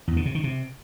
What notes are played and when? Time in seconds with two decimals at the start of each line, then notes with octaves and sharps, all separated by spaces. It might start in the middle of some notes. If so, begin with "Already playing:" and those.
0.08 E2
0.17 D3
0.26 C3
0.35 D#3
0.44 C3